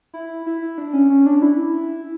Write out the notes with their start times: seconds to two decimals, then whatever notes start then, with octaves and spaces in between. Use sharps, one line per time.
0.14 E4
0.46 E4
0.78 D4
0.93 C#4
1.10 C#4
1.26 D4
1.42 E4